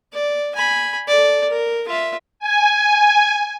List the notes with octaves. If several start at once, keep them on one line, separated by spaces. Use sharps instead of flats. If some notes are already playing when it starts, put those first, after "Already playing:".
D5
G#5 B5
A4 D5
A#4
F4 E5
G#5